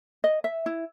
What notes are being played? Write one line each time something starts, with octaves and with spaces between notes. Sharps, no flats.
D#5
E5
E4